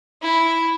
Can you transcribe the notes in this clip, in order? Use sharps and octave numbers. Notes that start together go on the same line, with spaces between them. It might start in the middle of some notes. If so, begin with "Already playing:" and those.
E4